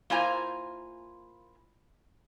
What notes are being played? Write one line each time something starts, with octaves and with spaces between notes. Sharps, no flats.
A#3 E4 F4 C5 G#5 A#5